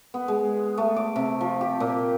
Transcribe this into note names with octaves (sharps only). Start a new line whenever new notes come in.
B3
G#3
A3
D6
C3
F3
G4
A#2